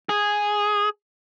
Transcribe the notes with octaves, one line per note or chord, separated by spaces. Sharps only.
G#4